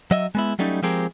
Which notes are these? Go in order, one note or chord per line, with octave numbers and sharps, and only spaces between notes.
F#3 D#5 E5
G#3 B3 E4
F#3 G3 A3 C#4 D#4
F3 G#3 C4 G4 G#4 A#4